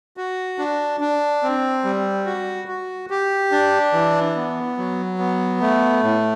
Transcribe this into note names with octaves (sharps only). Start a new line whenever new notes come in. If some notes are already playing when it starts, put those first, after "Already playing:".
F#4
D4
D4
C4
G3
F#4
F#4
G4
D4
E3
B3
F#3
B3
A3
A2